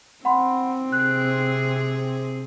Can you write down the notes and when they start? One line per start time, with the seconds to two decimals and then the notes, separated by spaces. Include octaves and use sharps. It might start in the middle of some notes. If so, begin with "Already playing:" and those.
0.25 C4 F#5 B5 C6
0.92 C3 G#4 F#6